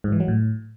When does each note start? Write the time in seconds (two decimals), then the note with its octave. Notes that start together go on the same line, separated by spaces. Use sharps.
0.04 G#2
0.12 E3
0.20 F#3
0.28 A2